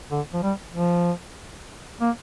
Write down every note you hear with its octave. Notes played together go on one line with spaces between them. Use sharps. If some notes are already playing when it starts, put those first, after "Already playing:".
D3
F3
G3
F3
A#3